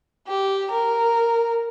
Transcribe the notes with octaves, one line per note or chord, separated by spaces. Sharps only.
G4
A#4